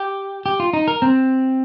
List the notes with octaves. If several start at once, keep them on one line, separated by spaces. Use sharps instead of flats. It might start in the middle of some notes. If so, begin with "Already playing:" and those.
Already playing: G4
G4
F4
D#4
A#4
C4